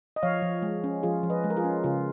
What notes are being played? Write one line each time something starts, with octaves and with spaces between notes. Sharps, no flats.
D#5
F3 C#5 F5
F3
G#3
C#4
F3 F4 G#4
F3
B4 D#5
G#3
A#4
F4 G#4
C#4
C#3 F4 G#4